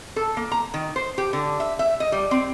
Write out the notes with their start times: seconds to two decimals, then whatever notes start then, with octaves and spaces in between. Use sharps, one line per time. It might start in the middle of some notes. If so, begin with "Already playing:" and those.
0.16 A4
0.37 A#3
0.52 A#5
0.74 D#3
0.96 C5
1.18 G4
1.33 D3
1.60 E5
1.79 E5
2.00 D#5
2.12 G3
2.31 C4